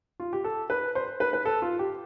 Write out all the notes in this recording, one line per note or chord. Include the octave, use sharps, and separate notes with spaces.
F4
G4
A4
B4
C5
B4
B4
A4
F4
G4